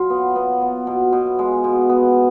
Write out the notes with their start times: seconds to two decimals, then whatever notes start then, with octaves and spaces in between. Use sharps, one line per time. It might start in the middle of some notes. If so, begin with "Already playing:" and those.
Already playing: F#3 F4
0.10 B3
0.36 B3
0.62 B3
0.87 B2
1.13 B2
1.39 G#3
1.64 B2
1.89 B3